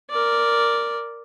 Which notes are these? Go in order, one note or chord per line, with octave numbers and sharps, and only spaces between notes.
A#4 D5